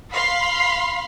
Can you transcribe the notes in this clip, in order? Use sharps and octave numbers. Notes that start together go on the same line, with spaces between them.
F5 B5 C6